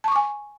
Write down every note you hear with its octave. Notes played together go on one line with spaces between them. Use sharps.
G#5 A5 C#6 D6